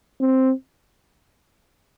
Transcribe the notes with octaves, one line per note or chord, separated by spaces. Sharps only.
C4